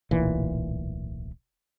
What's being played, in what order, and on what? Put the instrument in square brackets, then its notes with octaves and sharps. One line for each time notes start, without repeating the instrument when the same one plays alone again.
[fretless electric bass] D1 B1 A#2 E3